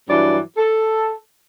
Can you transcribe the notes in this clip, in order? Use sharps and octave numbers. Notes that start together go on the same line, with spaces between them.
G2 E3 F#3 D5
A4